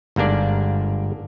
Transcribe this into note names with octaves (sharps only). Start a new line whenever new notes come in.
G1 G#2 A#3 D4 D5